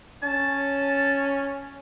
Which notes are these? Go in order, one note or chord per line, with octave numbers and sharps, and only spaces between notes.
C#4 A5